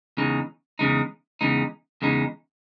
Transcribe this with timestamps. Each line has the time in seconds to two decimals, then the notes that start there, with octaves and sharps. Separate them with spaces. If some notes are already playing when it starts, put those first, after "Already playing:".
0.17 E2 C#3 G#3 D#4
0.79 E2 C#3 G#3 D#4
1.41 E2 C#3 G#3 D#4
2.02 E2 C#3 G#3 D#4